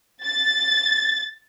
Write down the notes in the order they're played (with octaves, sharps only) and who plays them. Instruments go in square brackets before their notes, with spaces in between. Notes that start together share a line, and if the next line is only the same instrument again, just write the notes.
[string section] A6